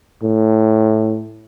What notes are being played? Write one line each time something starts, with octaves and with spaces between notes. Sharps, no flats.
A2